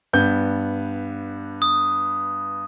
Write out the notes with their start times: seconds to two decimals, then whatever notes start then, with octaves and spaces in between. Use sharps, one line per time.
0.13 G2 B3 G6
1.62 D#6